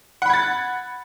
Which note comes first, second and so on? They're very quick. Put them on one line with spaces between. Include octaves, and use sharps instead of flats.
F#5 B5 G#6 A6